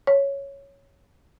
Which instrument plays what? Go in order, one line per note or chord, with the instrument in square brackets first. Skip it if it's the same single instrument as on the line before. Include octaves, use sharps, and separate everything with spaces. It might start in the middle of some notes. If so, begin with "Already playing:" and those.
[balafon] C#5